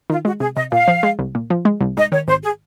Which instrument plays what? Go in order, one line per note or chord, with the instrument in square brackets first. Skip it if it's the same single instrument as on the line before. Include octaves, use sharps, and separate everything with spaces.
[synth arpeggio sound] D#3 [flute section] F4
[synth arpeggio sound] G#3 [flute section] F#4
[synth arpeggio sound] C3 [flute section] G#4
[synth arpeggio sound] C3 [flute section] D#5
[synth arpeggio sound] A#2 [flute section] F5
[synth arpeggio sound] F3
G#3
C2
A#2
F3
G#3
C2
[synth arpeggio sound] G#2 [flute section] D#5
[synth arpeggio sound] D#3 [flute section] C#5
[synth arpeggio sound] G#1 [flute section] C5
[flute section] G#4